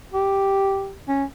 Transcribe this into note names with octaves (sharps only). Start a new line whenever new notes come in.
G4
C#4